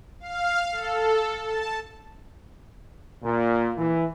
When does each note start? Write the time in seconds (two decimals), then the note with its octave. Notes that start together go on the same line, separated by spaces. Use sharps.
0.20 F5
0.72 A4
1.42 A5
3.23 A#2
3.77 E3